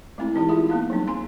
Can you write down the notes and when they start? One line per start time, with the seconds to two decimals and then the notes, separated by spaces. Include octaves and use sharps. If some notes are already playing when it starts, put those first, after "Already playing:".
0.18 G#3 A3 C4 E4
0.34 E3 D#4 E4 G4
0.49 E4 F4 G#4 E5
0.69 A#3 B3 D#4 F5
0.90 F#3 G3 C4 D#4
1.07 G#5 A#5 C6